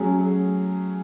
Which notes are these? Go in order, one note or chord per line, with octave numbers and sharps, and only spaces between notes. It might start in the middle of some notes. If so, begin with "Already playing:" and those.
Already playing: F#3 A3 C#4 G#4